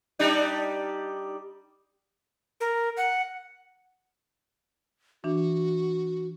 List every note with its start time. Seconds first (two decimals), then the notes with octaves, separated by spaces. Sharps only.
0.19 G3 D4 D#4
2.60 A#4
2.97 F#5
5.24 E3 D4 F#4